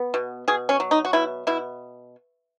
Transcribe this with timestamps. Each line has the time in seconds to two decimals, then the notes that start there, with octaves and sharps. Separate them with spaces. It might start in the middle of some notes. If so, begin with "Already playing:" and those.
Already playing: B3
0.14 B2
0.48 B2 G#4
0.69 C#4
0.80 F#3
0.91 D#4
1.05 F#4
1.13 B2 E4
1.47 B2 E4